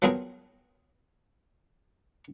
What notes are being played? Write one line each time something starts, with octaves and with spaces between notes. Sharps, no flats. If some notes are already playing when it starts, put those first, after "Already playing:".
F3 F#3 B3 C4 G#4 A#4